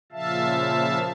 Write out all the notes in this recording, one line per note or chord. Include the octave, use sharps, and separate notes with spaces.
A#2 C#3 F3 E5 F5 A5